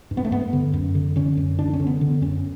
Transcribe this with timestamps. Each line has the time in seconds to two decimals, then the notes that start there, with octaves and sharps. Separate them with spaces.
0.11 G2
0.17 B3
0.24 A3
0.31 G2 B3
0.53 D3
0.73 F#2
0.95 D3
1.16 D3 C#4
1.37 F#2
1.58 D3 D4
1.73 C#4
1.80 D3
1.87 B3
2.01 D3
2.22 F#2 C#4